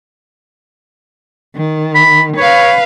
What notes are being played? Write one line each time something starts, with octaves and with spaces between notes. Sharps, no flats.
D#3
B5
B4 C#5 F5